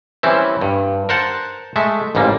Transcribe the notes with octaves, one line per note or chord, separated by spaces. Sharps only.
E3 G3 C4 C#4 E4
G2
A#4 C5 F#5 A5
G#3 A3 E5
A1 G#2 G3 A#3